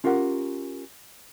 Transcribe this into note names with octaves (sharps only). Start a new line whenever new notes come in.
C#4 F4 G4 A#4 F#5